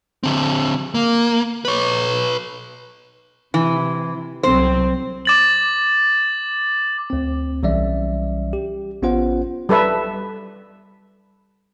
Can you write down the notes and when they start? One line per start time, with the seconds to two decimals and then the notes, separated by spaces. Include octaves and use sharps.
0.23 D3 C4
0.94 A#3
1.65 B4 C#5
3.54 C3 E3
4.43 C2 F#3 C4 C5
5.25 D6 A6 F#7
7.10 D2 C4
7.63 B1 E3 G3 C#4 D5 E5
8.53 G4
9.02 A1 B3 C#4 F4 C5 F#5
9.69 G3 A4 B4 E5